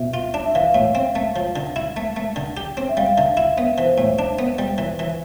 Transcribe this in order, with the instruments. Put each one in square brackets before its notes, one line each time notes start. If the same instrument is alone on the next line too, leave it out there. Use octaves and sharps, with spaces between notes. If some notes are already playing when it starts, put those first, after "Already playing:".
Already playing: [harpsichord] B2 [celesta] E5
[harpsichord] F4
D4
[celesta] E5
[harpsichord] E3 [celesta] F5
[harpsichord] A2
C4
A3
F3
D3
E4
A3
A3
D3
G4
C4
[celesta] E5
[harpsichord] G3 [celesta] F5
[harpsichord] D3 [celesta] E5
[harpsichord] E4 [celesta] E5
[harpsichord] B3 [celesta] E5
[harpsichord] E3 [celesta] C5
[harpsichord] A2
D4
B3
G3
E3
E3